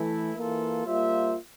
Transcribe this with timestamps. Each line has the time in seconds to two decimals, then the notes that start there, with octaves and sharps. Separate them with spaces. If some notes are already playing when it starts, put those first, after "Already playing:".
Already playing: E3 A3 E4
0.36 E3 A#3 F4 A4
0.86 G3 A#3 F4 C5 E5